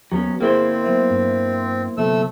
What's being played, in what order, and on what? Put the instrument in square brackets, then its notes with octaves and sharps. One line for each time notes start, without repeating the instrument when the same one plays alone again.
[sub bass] D#2 [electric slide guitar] F#3 B3 C#4 [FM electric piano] G5
[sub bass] G1 [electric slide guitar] A#3 E4 C5 [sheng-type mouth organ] C4 [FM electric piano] G#4 G#6
[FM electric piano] F#3 B3 E5
[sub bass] G2
[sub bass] G1 [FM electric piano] C3 F#3 B3 [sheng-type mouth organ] A3 E6